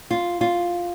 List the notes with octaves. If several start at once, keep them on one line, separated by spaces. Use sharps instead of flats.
F4
F4